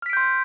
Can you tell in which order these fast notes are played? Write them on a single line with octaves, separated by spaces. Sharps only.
F6 B6 D7 G6 C6